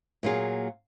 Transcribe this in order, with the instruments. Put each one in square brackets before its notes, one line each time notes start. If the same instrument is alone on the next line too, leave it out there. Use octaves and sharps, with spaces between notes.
[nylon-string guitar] A#2 F#3 A#3 F4 G#4